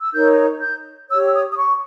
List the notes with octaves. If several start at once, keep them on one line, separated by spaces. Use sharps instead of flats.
E6
D#4 A#4 C#5 G6
G6
G4 C#5 E6
E6
D#6
D#6
C#6